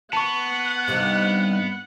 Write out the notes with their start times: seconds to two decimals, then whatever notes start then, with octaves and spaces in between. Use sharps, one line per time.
0.13 B3 F#5 A5 C#6
0.88 G2 C3 D#3